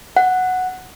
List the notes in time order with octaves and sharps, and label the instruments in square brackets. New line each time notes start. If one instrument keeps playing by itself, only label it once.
[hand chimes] F#5